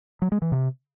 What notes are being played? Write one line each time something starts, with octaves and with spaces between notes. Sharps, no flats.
F#3
G#3
E3
C3